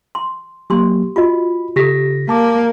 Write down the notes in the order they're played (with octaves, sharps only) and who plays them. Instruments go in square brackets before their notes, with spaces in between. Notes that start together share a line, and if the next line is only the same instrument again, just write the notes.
[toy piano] C6
[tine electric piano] F#3 A#3 [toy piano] G4 C6
[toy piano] F4 F#4 D#5 [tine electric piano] B5
[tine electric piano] C#3 A#6 B6 [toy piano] G4 A4
[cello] A#3 [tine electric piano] A5 D6